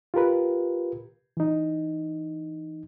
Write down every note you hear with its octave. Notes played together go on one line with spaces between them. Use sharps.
F4 G4 A#4 B4
E3 D#4